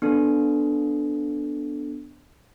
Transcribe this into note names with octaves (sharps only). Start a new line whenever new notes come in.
B3 D4 A4